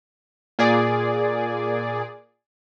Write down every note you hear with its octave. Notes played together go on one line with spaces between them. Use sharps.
A#2 G#4 D5